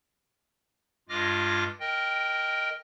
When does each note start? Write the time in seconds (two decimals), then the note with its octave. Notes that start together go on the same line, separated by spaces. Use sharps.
1.09 G2 G#3 F4 D6 F6 A#6
1.80 A#4 D#5 G5